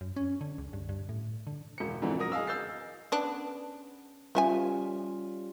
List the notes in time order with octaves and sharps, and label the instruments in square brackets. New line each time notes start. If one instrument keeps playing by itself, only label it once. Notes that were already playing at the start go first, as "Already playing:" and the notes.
[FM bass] F#2
C#4
D3
C#2
G2
G2
A2
D3
[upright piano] E1 C#7
F2 G#2 D3 E3 C4
F#2 A#4 D#6 A#6
G#4 D#5 F5 E6
E6 G6 A6 C7
[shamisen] B3 D4 [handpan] C#4
[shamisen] F3 E5 G#5 [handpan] G3 C#4 F4